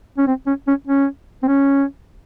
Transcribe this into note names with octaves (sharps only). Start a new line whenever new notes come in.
C#4
C4
C#4
C#4
C#4
C4
C#4